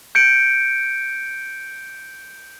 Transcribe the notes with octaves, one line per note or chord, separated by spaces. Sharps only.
G6 C#7 D7